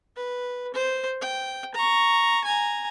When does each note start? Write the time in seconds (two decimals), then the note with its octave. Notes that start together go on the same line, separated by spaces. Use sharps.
0.16 B4
0.74 C5
1.21 G5
1.75 A#5 C#6
2.44 G#5 A#5